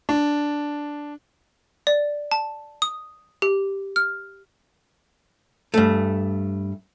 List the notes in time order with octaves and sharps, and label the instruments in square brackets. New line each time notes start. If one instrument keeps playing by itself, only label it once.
[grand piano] D4
[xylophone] D5
A5
D#6
G4
F6
[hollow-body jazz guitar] G2 A3